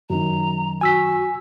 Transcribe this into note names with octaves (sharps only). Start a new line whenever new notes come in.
F#2 D#3 A#5
F#4 G#5 E6 B6